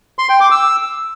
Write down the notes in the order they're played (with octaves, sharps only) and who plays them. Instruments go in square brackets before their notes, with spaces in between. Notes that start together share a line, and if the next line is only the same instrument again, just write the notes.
[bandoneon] C6
G5
D6
E6